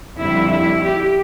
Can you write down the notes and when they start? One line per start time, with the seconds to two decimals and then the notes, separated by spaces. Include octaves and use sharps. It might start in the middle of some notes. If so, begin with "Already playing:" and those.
0.16 F2 D3 G3 E4
0.49 E4
0.82 G4